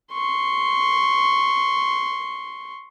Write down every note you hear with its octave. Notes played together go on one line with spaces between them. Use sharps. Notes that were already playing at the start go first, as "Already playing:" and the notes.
C6 C#6